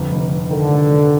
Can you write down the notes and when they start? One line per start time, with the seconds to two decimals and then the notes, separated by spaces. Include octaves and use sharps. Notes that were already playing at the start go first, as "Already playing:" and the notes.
Already playing: G1 F2
0.12 F1
0.31 F1
0.50 D3 D#3
0.70 F1
0.90 F1